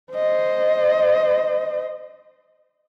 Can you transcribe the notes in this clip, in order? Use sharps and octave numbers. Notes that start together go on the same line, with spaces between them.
C5 D#5